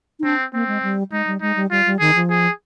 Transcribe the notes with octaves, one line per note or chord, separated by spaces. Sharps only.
D#4
C4 D4
A#3 C4
G#3
G3
G#3 D#4
G3
G#3 D#4
G3
G3 F4
G3
D#3 G#4
F3
G#4